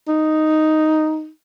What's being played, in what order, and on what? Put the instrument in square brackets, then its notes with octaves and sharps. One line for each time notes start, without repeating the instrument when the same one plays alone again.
[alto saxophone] D#4